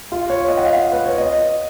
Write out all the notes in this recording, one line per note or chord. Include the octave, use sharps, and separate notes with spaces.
F4
C#5
D#5
F#5
F5
B4
C#5
D#5